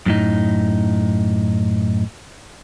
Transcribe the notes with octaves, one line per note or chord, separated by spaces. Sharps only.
F#2 A2 D#4